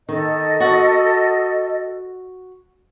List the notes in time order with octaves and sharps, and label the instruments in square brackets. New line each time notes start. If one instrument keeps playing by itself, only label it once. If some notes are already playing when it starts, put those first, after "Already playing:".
[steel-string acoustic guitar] D#3 [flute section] A4 D#5
[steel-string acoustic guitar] F#4 F#5